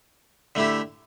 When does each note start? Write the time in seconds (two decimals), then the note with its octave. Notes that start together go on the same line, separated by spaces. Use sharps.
0.55 D3 A3 E4 G4